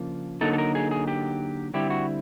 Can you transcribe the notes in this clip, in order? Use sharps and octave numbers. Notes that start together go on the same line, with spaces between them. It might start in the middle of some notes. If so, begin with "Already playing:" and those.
Already playing: C#3 F3 A#3 D4
D3 F#3 A#3 D#4 A4
A4
A#4
G#4
G#4
G4
D3 G3 C4 E4 G4
F#4